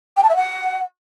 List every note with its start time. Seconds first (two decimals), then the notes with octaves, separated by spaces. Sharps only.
0.17 G5
0.23 A5
0.29 E5
0.35 F#5